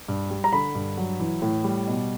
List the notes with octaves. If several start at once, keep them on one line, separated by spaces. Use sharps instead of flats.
G2
G3
A#5
D3 B5
G2
F#3
E3
A2
G3
B2